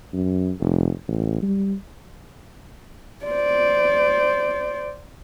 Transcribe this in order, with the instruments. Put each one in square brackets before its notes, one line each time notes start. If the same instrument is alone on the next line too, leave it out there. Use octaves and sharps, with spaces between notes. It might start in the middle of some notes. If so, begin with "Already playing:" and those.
[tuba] F#2
F1
A1
G3
[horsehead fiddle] C5 D5